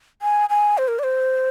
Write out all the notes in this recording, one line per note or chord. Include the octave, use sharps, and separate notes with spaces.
G#5
G#5
C5
A#4
D5
C5